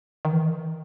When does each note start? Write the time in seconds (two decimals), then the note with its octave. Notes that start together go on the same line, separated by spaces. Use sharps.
0.25 D#3
0.33 E3